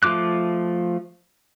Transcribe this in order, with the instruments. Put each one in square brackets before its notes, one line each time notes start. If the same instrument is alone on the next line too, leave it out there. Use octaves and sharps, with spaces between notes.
[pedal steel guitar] F3 A3 F4 D6 F#6